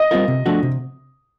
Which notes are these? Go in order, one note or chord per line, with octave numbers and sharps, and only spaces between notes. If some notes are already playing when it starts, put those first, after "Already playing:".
Already playing: D#5
G3 C4 F4 A#4
C3
F3 A3 D4 F#4
C3